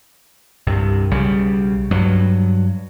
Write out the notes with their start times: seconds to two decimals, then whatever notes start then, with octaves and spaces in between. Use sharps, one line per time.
0.67 C2 G2 C3
1.11 B1 C#3 G3
1.91 G2 F#3